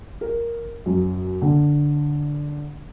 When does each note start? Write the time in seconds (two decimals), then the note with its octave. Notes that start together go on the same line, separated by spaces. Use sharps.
0.21 A#4
0.86 F#2
1.42 D3